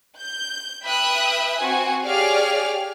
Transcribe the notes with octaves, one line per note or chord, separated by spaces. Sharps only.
G6
B4 E5 G5 B5 D#6 F#6
C4 F#4 G#5
G4 G#4 C#5 D5 F5 F6